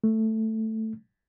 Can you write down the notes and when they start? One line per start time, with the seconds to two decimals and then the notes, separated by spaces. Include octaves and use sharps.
0.04 A3